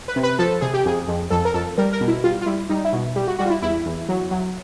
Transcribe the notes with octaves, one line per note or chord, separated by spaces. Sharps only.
B4
C3
B4
F3 A4
C3 G#4
G4
F2 G#4
F2
F2 A4
A#4
F2 A4
G3 A#4
A#4
B2
E4
G3 F4
F4
G3 E4
G3 D#4
E4
B2
G3 G4
F#4
G3 F#4
F4
E4
E2 E4
E2
F#3
F#3